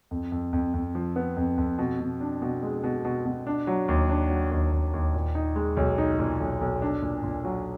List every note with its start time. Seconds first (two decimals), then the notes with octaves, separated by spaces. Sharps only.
0.11 F2
0.32 F2
0.53 F2
0.74 F2
0.95 F3
1.16 B3
1.37 F2
1.58 F2
1.78 B2
2.00 B2
2.21 D4
2.42 B2
2.63 G#3
2.84 B2
3.05 B2
3.25 B2
3.47 D4
3.67 F#3
3.88 D#2
4.09 D4
4.30 F#3
4.51 D#2
4.72 D#2
4.93 D#2
5.14 A#2
5.35 D#4
5.56 G#3
5.77 B1
5.98 D#4
6.19 A#2
6.40 B1
6.61 B1
6.82 D4
7.02 A#2
7.23 A#2
7.44 F#3